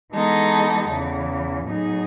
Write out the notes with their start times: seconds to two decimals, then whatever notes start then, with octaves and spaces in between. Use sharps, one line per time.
0.13 E3 G#3 B3 D#4 A4
0.89 E2 C#3 E3
1.66 A2 F#3 B3 D#4 G#4